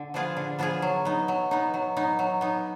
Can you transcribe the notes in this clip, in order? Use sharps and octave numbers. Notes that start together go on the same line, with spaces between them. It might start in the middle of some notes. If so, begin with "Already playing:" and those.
Already playing: D3
F3 B3 F4 G#4
D3
F3 B3 F4 G#4
F#3
B3 D#4
F#3
B3 D#4
F#3
B3 D#4
F#3
B3 D#4